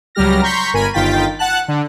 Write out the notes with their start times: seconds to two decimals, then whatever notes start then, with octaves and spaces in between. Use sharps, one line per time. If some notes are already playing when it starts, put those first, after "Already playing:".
0.15 C#2 F#3 G3 G4 F6 A#6
0.42 A#5 C6 C#6 G6 B6
0.73 G1 A#4 G#5 B5 D#7
0.93 G1 D#3 F4 G5 A6 B6
1.39 F#5 A5 F#6
1.68 D3